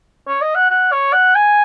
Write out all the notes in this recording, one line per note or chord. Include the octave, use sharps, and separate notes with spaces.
C#5
D#5
F#5
F#5
C#5
F#5
G#5